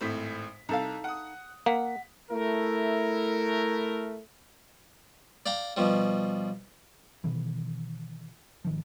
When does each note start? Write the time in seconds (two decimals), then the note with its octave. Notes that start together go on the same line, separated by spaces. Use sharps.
0.01 G#1 A2 C5 B6
0.69 C2 D#4 A4 F5
1.04 F#5 D#6
1.66 A#3 F#5 B6
2.31 A3 E4 A#4
5.46 D5 F5 G5 A#5
5.77 B2 F3 G3
7.24 B2 D#3 E3
8.65 G#1 D#3 F3